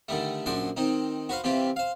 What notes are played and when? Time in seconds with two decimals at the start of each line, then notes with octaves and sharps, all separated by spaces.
0.08 D3 D#3 G3 A3
0.46 A#1 F#2 D4 F#4 C6
0.77 D#3 C4 D#4
1.29 F#4 B4 C5 F5
1.44 C3 E3 C4 F4 G4
1.76 C5 F5